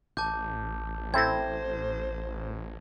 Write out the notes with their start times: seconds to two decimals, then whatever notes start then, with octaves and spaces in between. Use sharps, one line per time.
0.17 A1 A5 D6 G6
1.14 C4 E4 A4 C5 G#6 A#6